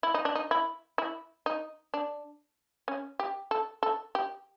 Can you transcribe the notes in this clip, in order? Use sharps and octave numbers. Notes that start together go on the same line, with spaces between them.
E4
D#4
D4
D#4
E4
E4
D#4
D4
C#4
G4
A4
A4
G4